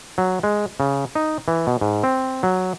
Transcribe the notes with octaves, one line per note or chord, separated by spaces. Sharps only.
F#3
G#3
C#3
D#4
E3
B2
G#2
C4
F#3